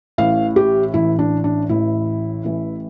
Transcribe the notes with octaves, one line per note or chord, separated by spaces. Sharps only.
A1 A2 E3 F5
G4
A1 A2 E3 E4
D4
D4
A1 A2 E3 E4
A1 A2 E3